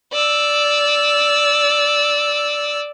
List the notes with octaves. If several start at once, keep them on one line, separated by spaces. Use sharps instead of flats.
D5 E6